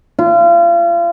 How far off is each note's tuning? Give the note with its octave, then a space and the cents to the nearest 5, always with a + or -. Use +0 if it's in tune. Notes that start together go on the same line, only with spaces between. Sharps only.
F4 -35